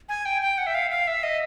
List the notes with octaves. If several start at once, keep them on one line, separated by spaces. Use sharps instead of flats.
G#5
G5
G5
F#5
E5
F5
F5
E5
D#5